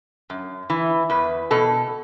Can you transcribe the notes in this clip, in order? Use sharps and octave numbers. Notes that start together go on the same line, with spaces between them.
F#2
E3
E2 B4
B2 A4